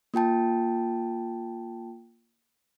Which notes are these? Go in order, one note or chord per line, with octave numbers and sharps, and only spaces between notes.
A#3 F4 G5 A5